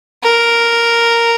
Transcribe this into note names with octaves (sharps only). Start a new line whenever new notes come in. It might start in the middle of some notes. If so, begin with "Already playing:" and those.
A#4